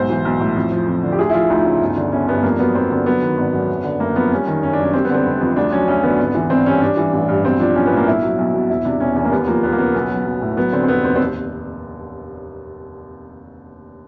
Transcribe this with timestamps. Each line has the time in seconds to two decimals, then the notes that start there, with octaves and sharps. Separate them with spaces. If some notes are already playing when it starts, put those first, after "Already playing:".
Already playing: B1 G#2 C5
0.10 E3
0.25 B1
0.40 A2
0.56 F2
0.72 F3
0.87 F2
1.03 D3
1.12 G4
1.19 D2 G#4
1.30 E4
1.34 F3 F4
1.50 D2 D#4
1.66 C#3
1.81 G1
1.97 D3
2.12 G1 C#4
2.28 G2 B3
2.43 F2 A#3
2.59 F#3 B3
2.75 F2 C4
2.90 D3 C4
3.06 F#3 B3
3.22 D#3
3.37 G#1
3.53 F#2
3.69 F#1
3.84 D3
4.00 F#1 A#3
4.16 F2 B3
4.32 G3 C#4
4.47 D#3
4.63 F#1 C#4
4.73 D4
4.79 F#2
4.84 C#4
4.93 G3 C4
5.05 B3
5.10 D3 C4
5.26 F1
5.41 F2
5.56 D2 D4
5.72 F#3 C#4
5.88 D2 C#4
6.03 D3 B3
6.19 G#1
6.35 E3
6.50 G#1 C4
6.66 G2 C#4
6.81 G3 D4
6.97 E3
7.13 A1
7.28 G2
7.44 B1 C4
7.60 F3 D4
7.75 B1 C#4
7.86 B3
7.92 A2
7.97 A#3
8.07 B1 E4
8.23 F#3
8.38 B1
8.54 B2
8.70 E1 E4
8.85 C3 D4
9.00 E1 C#4
9.16 E2 C#4
9.25 A#3
9.32 D#2 B3
9.47 F3 A#3
9.63 D#2 B3
9.72 A#3
9.79 C#3 B3
9.94 B1
10.10 F#3
10.25 B1
10.42 A2
10.57 F#3 B3
10.72 D3 C4
10.83 C4
10.88 F1 B3
11.04 D#2 C4
11.16 C4